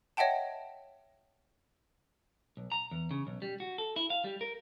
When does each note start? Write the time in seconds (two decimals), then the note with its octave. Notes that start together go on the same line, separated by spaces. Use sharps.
0.17 C#5 D#5 E5 F#5 G5 A5
2.57 B1
2.72 A#5
2.91 E2
3.11 C#3
3.27 B1
3.42 G3
3.60 F#4
3.78 A4
3.96 E4
4.10 F5
4.24 G3
4.41 A#4